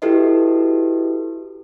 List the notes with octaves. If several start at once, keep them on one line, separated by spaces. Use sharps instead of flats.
E4 F#4 G4 A4 B4 D#5